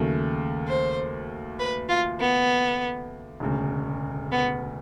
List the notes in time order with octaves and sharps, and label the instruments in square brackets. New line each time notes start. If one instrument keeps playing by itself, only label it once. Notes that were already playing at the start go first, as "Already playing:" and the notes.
Already playing: [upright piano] D#2 C#3 F#3 A3
[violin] C5
B4
F4
B3
[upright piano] E1 D2 C#3
[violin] B3